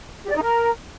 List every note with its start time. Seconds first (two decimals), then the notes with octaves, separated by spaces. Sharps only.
0.24 G4
0.30 D5
0.36 D#4
0.42 A#4